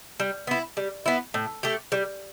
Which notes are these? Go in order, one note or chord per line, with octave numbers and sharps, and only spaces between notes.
G3
B3 E4
G3
B3 E4
A2
A3 G4
G3